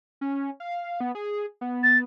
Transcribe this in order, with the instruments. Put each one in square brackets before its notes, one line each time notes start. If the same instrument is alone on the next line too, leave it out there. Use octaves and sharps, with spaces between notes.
[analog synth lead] C#4
F5
B3
G#4
B3
[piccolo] A6